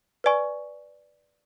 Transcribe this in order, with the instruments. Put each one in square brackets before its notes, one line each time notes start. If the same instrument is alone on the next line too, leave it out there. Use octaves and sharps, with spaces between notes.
[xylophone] B4 D5 G#5 C#6